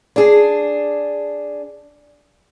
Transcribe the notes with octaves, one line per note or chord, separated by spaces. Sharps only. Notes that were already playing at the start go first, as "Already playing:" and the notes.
D4 G#4